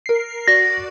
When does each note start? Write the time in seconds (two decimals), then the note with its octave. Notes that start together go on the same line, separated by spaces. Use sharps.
0.06 A#4 C7
0.48 F#4 D5 A#6